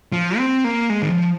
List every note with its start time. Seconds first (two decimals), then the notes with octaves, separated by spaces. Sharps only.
0.12 F3
0.38 C4
0.64 A#3
0.90 G#3
1.02 D#3
1.09 F3